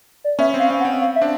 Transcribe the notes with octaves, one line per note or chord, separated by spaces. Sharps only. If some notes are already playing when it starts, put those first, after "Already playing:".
D5
B3 C#4 E5
C4
F5
C4
F#5
C4
F5
E5
C4 D4